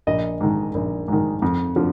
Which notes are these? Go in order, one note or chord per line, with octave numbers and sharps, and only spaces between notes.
A#1 D#5
G#2 D#3
A#1
G#2 D#3
F2
D3 F3